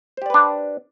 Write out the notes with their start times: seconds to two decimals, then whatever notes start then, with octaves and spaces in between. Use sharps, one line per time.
0.17 C5
0.22 G4
0.26 D5
0.30 B4
0.34 D4